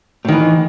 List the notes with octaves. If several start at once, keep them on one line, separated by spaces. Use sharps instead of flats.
A2 D#3 E3